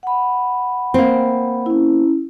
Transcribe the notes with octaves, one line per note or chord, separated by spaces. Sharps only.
F#5 B5
A#3 C4
C#4 E4